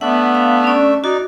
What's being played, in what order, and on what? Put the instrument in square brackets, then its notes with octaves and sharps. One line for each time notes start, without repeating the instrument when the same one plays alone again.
[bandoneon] A3 D4 E5 [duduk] B3 [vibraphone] F#5
[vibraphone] F5
C#4 D5
[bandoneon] D#4 D5 [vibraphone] F#4